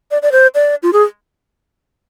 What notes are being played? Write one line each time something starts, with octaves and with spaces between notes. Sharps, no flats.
D5
D5
C5
D5
F4
G#4